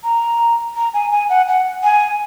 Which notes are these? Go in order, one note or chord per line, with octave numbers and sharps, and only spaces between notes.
A#5
A#5
G#5
G#5
F#5
F#5
G#5